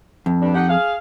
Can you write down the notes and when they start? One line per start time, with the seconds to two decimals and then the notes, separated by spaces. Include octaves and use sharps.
0.26 F2
0.41 G2 D4
0.55 D#4 G4 F#5
0.69 G#4 F5